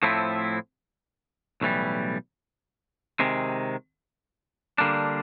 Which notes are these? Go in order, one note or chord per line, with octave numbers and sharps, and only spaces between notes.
A2 F3 A3 C4 E4
B1 A2 E3 G3
C3 D#3 G#3
D3 G3 A#3 D4